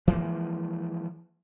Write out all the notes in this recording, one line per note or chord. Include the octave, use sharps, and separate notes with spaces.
E3 F3 G#3 A#3